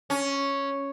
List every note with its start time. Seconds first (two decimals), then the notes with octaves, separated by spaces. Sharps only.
0.10 C#4